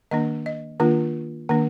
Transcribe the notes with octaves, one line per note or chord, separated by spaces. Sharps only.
D#3 A#3 D4 D#5
D#5
D#3 A#3 D4 F4
D#3 A#3 D4